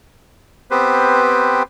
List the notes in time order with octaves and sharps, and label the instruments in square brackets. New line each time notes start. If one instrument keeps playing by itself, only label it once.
[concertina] B3 C4 G4 B4 C5